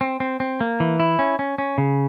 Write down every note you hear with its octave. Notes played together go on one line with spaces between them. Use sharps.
C4
C4
C4
A#3
E3
E4
C#4
C#4
C#4
C#3